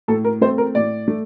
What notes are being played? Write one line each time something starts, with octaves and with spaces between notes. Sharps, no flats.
A2 A4
A#4
A3 C4 C5
A#4
A2 D5
A3